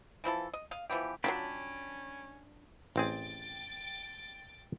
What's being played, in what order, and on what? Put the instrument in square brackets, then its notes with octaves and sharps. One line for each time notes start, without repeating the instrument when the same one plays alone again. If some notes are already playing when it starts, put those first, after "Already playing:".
[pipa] E3 F3 E4 A4
D#5
D#5 F5
E3 F3 B3 G4
[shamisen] F#3 E4 F4 [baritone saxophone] C#4 [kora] D4 [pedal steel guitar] G5 A5 B5
[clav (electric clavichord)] A1 C4 G#4 [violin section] G5 A6 D7